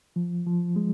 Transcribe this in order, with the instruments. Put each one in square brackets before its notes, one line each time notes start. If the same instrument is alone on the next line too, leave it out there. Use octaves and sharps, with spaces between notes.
[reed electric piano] F3
F3
G#3